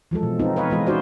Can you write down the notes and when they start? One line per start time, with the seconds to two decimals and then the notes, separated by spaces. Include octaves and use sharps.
0.11 E3 F3 G#3 A4
0.23 B2
0.39 B3 C4 D#4 F4
0.56 B4 C#5 D#5 F5
0.70 E3 G#3 F4 D#5
0.86 C#4 D#4 F4 F#4 C5 D5